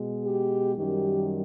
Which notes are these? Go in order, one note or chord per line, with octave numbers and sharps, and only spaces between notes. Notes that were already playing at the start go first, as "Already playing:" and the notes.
Already playing: B2 G#3
G4
F#2 D#3 G3 G4